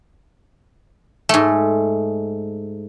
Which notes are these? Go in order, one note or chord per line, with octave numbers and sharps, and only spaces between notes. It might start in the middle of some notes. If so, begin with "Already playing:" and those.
G#2 A3